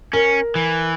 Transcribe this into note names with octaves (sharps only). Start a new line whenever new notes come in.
C#4 A#4
E3